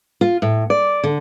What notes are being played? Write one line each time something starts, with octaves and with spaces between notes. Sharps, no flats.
F4
A2
D5
D3